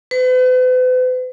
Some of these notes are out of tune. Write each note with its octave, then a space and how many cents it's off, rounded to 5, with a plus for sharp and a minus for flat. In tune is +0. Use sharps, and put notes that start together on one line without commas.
B4 +45